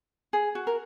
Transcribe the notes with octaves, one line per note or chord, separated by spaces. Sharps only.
G#4
F#4
A#4